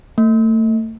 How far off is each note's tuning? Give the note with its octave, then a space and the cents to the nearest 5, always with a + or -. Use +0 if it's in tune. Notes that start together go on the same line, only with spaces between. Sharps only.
A3 +30